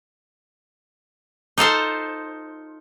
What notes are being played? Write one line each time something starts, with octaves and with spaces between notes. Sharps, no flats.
D#4 F4 A4 C5